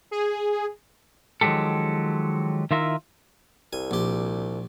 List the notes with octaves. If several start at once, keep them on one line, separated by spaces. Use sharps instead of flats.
G#4
D#3 F3 F#3 G#3 G4 A4
D#3 E4 F4 A#4 E5
C2 G#5
A#1 G4